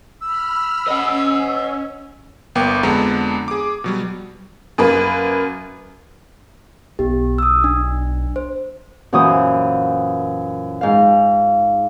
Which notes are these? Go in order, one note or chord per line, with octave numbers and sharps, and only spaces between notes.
B5 E6 F6
C#4 D#5 F#5
G1 A#3 B3 G5 D6
F2 D3 G#3 B3 D4 A#5
G#4 D6
B2 F#3 G3
F#2 A#3 B4
B1 B3 G4
D#6 E6
D4
C5
F#2 A#2 E3 F#4 C5 D#6
G#2 F5